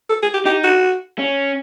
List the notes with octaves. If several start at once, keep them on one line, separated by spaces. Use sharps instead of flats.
A4
G#4
G4
D#4 G4
F#4
C#4